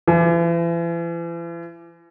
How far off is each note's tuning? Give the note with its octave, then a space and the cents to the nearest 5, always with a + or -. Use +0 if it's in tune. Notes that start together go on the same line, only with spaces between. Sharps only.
E3 +40